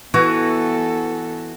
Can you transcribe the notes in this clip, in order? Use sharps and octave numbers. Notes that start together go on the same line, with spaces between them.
E3 B3 F#4 A4